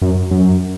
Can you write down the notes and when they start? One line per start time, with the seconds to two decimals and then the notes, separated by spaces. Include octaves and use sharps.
0.02 F#2
0.31 F#2